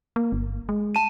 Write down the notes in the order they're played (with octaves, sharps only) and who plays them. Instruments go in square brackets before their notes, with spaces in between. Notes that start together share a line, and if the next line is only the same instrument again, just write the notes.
[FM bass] A#3
G1
G#3
[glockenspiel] A5 D#7